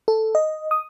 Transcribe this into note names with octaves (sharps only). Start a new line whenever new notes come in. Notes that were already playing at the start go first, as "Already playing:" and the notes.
A4
D#5
D#6